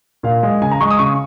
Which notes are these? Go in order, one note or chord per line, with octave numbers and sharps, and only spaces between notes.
A#2 F5
G#3
C#3 G#5
A#5
G#3 C#6
D#6
C#3 C#6